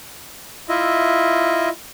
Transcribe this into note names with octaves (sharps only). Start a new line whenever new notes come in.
E4 F4 D#5 E5